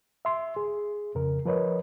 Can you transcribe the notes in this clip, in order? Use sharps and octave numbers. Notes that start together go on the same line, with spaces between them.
E5 C6
G#4
F2 C#3 A#4
F3 A#4 B4 C#5 D#5